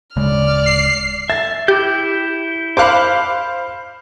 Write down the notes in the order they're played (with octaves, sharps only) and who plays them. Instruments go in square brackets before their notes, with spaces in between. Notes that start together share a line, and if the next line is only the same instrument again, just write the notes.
[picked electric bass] D1 C#3 G#3 [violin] D5 F6
[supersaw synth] C7
[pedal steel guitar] E5 [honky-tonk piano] A6
[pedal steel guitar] E4 G6 [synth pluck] G4
[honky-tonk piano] C5 F5 B5 [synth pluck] D6 F#6